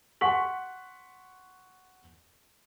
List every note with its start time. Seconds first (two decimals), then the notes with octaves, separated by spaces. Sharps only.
0.21 F#5 C6 C#6 B6 F#7